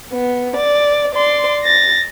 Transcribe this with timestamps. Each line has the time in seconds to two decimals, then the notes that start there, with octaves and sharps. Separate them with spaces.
0.12 B3
0.57 D5
1.15 D5 C6
1.64 A6 A#6